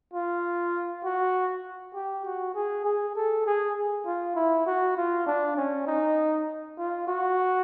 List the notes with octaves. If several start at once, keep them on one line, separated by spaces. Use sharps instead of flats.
F4
F#4
G4
F#4
G#4
G#4
A4
G#4
F4
E4
F#4
F4
D4
C#4
D#4
F4
F#4